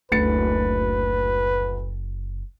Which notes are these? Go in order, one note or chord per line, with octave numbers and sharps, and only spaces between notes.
F#1 D2 B4 A6 C#7